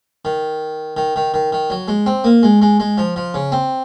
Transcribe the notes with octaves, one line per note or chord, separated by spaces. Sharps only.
D#3
D#3
D#3
D#3
D#3
F#3
G#3
C4
A#3
G#3
G#3
G#3
F3
F3
C#3
C4